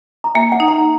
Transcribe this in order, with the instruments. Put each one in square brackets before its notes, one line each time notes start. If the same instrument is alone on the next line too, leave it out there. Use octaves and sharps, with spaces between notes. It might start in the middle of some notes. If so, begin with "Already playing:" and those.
[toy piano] A#5
[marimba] A#3 [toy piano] E5 G#5
[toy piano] F#5 A#5
[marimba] D#4
[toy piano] F#5 A#5